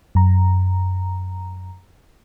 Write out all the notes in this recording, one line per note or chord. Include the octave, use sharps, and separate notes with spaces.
F#2 A#5